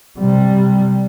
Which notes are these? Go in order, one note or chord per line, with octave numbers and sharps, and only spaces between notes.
C3 G3